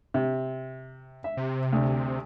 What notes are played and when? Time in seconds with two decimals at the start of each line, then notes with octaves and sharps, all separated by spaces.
0.14 C3
1.24 E5
1.37 C3
1.73 D2